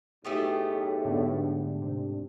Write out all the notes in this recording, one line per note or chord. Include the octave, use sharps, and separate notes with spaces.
B1 A2 A3 G4 G#4 C#6 D#6 A6
G#2 D3 B3 D4
C3